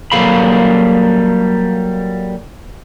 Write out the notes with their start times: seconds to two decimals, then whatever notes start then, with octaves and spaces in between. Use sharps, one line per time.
0.12 F#3 G3 A#3 A4 F5 B5